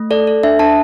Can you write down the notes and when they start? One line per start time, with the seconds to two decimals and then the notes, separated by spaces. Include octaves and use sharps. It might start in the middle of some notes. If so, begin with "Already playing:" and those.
Already playing: A3
0.11 A4 D5
0.27 A4
0.43 D4 E5
0.59 D4 A5